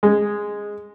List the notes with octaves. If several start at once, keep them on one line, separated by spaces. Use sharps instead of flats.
G#3